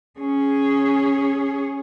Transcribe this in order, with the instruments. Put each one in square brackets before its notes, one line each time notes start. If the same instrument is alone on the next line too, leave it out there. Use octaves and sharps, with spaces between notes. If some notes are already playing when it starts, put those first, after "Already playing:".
[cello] C#4 G#4